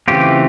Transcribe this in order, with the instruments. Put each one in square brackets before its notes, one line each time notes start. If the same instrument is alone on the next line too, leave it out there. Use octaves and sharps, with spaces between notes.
[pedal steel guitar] C#3 E3 A3 C4 F4 G4